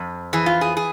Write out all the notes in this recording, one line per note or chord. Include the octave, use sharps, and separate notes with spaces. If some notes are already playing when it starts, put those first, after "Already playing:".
Already playing: F2
E3 G#4
F4
G#4
G#4